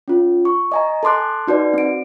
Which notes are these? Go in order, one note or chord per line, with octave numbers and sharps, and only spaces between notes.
C#4 F4
C#6
D#5 G#5 A#5
A4 A5 C6 D6 F#6
D#4 F#4 B4 D5
C4 D7